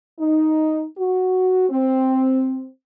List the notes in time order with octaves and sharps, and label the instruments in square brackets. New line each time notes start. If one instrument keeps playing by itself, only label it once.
[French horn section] D#4
F#4
C4